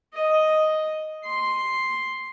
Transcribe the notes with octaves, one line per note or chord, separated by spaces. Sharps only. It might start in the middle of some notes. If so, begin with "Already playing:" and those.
D#5
C6